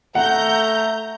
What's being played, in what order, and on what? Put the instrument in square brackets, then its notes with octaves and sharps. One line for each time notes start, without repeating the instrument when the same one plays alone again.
[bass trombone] A3 [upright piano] F#5 [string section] A#5 G6